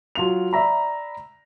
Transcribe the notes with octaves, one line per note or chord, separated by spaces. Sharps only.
F#3 F4 F7
D5 E5 A#5 B5